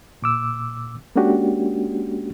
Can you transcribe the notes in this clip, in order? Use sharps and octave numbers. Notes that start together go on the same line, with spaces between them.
A#2 D6 E6
G#3 A#3 C#4 D4 F#4 G4